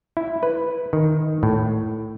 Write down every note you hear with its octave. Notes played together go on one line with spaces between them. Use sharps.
E4
B4
D#3
A2